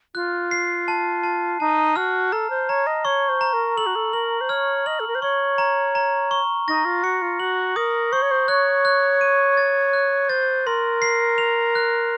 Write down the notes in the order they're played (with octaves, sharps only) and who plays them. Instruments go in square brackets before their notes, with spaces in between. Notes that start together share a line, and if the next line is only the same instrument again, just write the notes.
[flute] F4 [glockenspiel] F#6
[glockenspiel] C7
A5
A5
[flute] D#4 [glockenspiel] A5
[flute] F#4 [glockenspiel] F6
[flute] A4 [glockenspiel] A#5
[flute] C5
[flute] C#5 [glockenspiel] A#5
[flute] D#5
[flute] C#5 [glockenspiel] C#6
[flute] C5
[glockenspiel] A#5
[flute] A#4
[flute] A4 [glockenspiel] F#7
[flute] F#4
A4
[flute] A#4 [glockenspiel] F#7
[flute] C5
[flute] C#5 [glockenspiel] F6
[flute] D#5 [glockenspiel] F#7
[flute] A4
A#4
C5
[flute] C#5 [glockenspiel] C#6
[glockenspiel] A#5
A#5
C#6
[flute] D#4 [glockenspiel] A#6
[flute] F4
[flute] F#4 [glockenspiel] C#7
[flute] F4
[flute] F#4 [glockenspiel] F#7
[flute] A#4 [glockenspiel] D#6
[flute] C5 [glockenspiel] C#6
[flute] C#5
C5
[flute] C#5 [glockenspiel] F#6
[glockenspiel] F#6
D#7
A6
F#6
[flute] C5 [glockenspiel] A6
[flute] A#4 [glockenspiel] C6
[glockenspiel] C7
F7
F#6